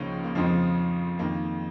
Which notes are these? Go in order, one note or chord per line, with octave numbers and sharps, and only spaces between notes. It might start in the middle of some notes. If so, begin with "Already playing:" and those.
Already playing: C#2 C#3 F3 A#3 C#4 D#4
A#3
F2 C#3 F3 G#3 C4
F2 D#3 A#3